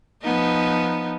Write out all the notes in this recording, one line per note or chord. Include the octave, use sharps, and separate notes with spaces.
F3 B3 D#4